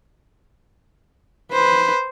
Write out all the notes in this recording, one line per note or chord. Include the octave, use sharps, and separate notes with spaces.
B4 C5